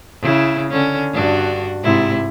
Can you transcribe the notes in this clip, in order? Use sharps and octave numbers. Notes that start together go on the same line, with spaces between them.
C#3 E4
D3 C#4
G2 D4 F#4
G#2 C3 E4